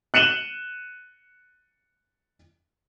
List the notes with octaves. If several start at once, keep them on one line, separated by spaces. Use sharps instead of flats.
F#6 C#7 D#7 E7 F#7 G7